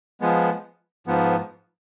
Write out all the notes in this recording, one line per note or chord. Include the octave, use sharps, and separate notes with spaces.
F3 G#3 B3
G#2 F3 B3